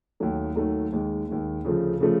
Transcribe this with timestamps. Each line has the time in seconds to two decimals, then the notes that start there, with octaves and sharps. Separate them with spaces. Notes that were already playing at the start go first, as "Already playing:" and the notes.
0.20 D#2 D#3 F#3 A3
0.56 D#2 D#3 F#3 A3
0.92 D#2 D#3 G#3
1.29 D#2 D#3 G#3
1.65 D2 C#3 F3 A3
2.00 C#3 F3 A3